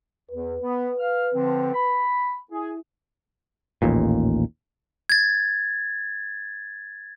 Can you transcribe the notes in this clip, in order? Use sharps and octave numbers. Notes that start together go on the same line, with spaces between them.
E2 B4
B3
F5 F6
D3 F3 C4
B5
E4 G#4
A1 D#2 A#2
G#6 A6